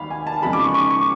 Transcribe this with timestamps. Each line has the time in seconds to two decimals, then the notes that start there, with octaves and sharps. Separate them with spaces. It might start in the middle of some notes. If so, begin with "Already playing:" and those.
Already playing: D#2 D#3 G3 F5 B5
0.11 G#5
0.27 A5
0.42 E2 C#3 F3 G#3 B5
0.53 D6
0.64 C#6
0.74 C#6
0.90 C#6